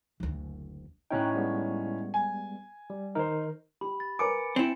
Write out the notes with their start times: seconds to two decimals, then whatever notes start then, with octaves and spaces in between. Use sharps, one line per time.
0.20 F#1 D2
1.11 A2 C#4 D#4 G5 A#5 F#6
1.34 G3 G#3 B3
2.14 G#5
2.90 G3
3.15 D#3 D#4 A#4 C5
3.81 G4 B5
4.00 A6
4.19 A#4 B4 G#5 D6 C#7 D7
4.56 C4 E4